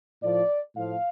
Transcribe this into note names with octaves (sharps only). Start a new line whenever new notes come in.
A2 F3 D5
A2 F3 F5